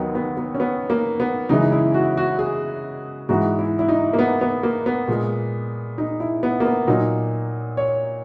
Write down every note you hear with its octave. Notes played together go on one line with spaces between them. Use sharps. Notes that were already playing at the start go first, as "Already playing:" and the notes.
Already playing: D#2 D#3 F#3 B3 D#4
B3
B3
C#4
B3
A#3
B3
F#2 C#3 E3 G#3 D#4
E4
F#4
F#4
G#4
G#2 E3 G#3 F#4
E4
E4
D#4
A#3
B3
B3
A#3
B3
A#2 G#3
D#4
E4
B3
A#3
B3
A#2 F#3 D#4
C#5